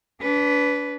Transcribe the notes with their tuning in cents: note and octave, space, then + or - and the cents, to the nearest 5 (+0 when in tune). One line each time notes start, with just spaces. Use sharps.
D4 -30 B4 +0